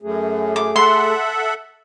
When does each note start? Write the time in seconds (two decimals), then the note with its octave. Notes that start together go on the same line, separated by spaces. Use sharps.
0.02 F#2 A3 G#4
0.56 D6
0.76 A4 E5 F#5 C6